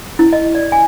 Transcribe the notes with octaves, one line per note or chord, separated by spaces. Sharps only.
E4
D#5
D5
G#5